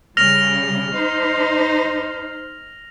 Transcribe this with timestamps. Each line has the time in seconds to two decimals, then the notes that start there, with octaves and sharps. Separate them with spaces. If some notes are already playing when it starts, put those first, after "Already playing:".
0.17 C#3 G3 F6 A#6 F7
0.95 D#4 C5